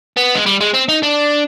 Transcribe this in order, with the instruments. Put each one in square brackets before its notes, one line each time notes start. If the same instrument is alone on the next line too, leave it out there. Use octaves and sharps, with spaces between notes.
[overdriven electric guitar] B3
G#3
G3
G#3
C4
D#4
D4